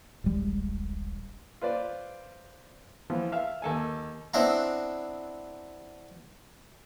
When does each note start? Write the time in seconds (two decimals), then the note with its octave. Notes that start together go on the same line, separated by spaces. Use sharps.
0.24 D1 A1 G3 G#3
1.61 F4 B4 C5 D5
3.10 E3 F3 B3 F4
3.32 E5 F5 F6
3.62 D#2 A4 G#5
4.34 B3 C4 D4 E4 F#5 A#5